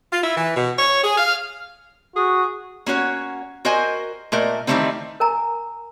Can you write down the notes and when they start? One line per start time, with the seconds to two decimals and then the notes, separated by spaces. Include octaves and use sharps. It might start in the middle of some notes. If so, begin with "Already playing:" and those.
0.12 F4
0.23 E4
0.37 E3
0.56 B2
0.79 C#5
1.04 G#4
1.18 F5
2.16 F#4 G#4
2.86 A#3 C#4 F#4 C#5
3.65 F#4 A#4 C5 D#5 G#5
4.32 A#2 A3 A#4 D#5
4.67 D#3 E3 G3 A3 C4 D#4
5.20 A#4 G#5 A#5